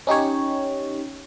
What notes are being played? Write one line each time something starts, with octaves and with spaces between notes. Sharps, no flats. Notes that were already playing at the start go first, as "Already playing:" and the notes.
C#4 D#4 G4 C#5